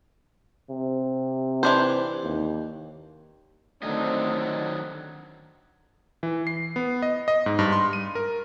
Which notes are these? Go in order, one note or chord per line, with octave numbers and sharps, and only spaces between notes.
C3
E3 D4 C5
D#2
D3 D#3 F#3 A3 C4 D#5
E3
C7
B3
D#5
D#5
G#2
G2
C6
D#7
A#4